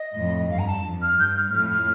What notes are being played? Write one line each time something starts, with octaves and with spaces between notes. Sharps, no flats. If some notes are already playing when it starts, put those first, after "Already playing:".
Already playing: D#5
F2 A2
G2 F5
A#5
A5
F2
F6
G2 G6
F6
F2 A2 F6
F6